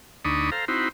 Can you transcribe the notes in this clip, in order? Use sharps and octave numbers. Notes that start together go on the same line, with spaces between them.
D2 D4 D#4 B5 C#6 D#6
A4 C5 F5 A#5
C4 D#4 E4 F#4 C5 B5